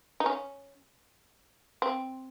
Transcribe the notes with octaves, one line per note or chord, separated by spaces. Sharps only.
D#4
C#4
C4